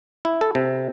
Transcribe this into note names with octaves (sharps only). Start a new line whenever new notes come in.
E4
A4
C3